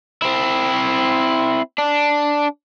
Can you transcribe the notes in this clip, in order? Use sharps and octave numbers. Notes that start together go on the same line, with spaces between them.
C4 E4
D4